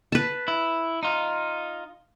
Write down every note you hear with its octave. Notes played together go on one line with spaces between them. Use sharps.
B4 A5
E4
D#4 F4